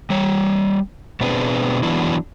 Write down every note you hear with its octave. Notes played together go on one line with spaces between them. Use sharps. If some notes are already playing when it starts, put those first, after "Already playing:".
G3 C#5
B2 B3 C4 D4 G#4 B4
E3 F#3 B3 D4 E4